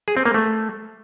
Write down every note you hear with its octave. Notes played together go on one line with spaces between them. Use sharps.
G#4
C4
A#3
A3